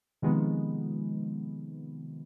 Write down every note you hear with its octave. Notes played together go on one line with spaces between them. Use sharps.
C3 D#3 F3 G#3 B3